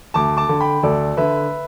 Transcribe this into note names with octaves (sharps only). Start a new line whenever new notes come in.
D2 A5 D6
A5 D6
D3
G5 B5
D2 A4 D5
D3 B4 E5